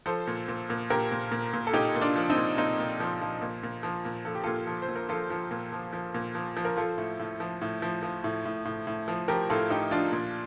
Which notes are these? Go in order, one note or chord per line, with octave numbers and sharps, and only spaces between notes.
F3 A4 C5
A#2
A#2
A#2
A#2 G4 A#4
A#2
A#2
A#2
A4
A#2 D#4 G4
A#2
D4 F4
F3
C4 D#4
A#2
A#2 C4 D#4
A#2
F3
F3
A#2
A#2
F3
A#2
F3 A4
G4
A#2 F4 A4
F3
C5
A#2
A#4
F3 F4 A4
F3
A#2
F3
F3
A#2
F3
F3
A#4
F3 F4 A4
A2
A2
F3
A2
F3
F3
A2
A2
A2
A2
F3
F3 G4 A#4
A2 F4 A4
A2 D#4 G4
F3 D4 F4
A#2